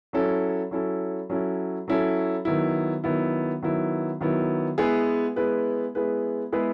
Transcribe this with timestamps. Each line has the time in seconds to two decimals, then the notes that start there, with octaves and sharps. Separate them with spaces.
0.13 F#3 C#4 E4 A4
0.71 F#3 C#4 E4 A4
1.30 F#3 C#4 E4 A4
1.88 F#3 C#4 E4 A4
2.45 D#3 F#3 B3 E4
3.04 D#3 F#3 B3 E4
3.62 D#3 F#3 B3 E4
4.21 D#3 F#3 B3 E4
4.78 G#3 B3 E4 G#4 B4
5.36 G#3 B3 E4 G#4 B4
5.95 G#3 B3 E4 G#4 B4
6.52 G#3 B3 E4 G#4 B4